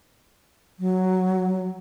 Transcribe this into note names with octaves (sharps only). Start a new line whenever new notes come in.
F#3